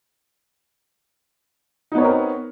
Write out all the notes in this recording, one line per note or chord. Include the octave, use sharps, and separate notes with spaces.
B3 C4 D#4 A#4 C#5